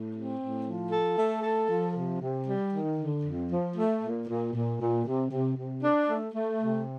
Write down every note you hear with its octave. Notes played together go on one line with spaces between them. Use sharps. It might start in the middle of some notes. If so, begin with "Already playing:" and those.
Already playing: A2
C4
A2
F3
A4
A3
A4
F3
C3
C3
G3
D#3
D3
F2
F3
A3
A#2
A#2
A#2
A#2
C3
C3
C3
D4
A3
A3
C3